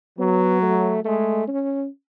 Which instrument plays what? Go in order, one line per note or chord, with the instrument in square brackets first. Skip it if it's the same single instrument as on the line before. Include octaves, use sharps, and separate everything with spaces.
[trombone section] F#3 [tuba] B3
[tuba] A3
[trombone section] G#3 [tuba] A3
[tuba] C#4